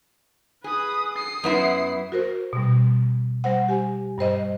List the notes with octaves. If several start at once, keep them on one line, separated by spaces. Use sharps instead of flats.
G#4 B4 D#6
D#6 C7
F#2 B3 E4
F#4 A#4 C5
B2 G3
G3 C5 F#5
G4 G#5
G2 G3 C5 D#5